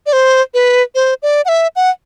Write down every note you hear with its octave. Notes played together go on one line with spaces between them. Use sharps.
D5
C5
B4
C5
D5
F#5
E5
F#5